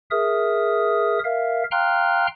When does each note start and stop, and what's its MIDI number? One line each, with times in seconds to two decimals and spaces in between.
0.11 1.19 68
0.11 1.19 70
0.11 1.19 76
0.11 1.19 87
1.24 1.64 70
1.24 1.64 76
1.24 1.64 77
1.71 2.27 77
1.71 2.27 79
1.71 2.27 82
1.71 2.27 84
1.71 2.27 89
1.71 2.27 90